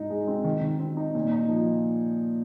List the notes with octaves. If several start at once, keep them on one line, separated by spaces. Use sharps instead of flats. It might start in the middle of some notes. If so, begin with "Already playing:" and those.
Already playing: G#2 D#4
G#3
C4
D#3
D#3
C4
D#4
A#2
D#4
F3